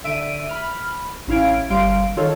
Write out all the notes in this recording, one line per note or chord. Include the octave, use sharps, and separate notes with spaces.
D3 E5 D7 D#7
B5 F6
A1 C#4 E4 F5 G#6 D7
G1 G3 F5 C6 D7
D#3 F4 A4 C#5